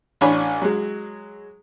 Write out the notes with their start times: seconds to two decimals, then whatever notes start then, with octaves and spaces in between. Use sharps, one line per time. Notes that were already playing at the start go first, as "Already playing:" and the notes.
0.21 A1 D4 C#5 G#5 B5
0.62 F#3 G#3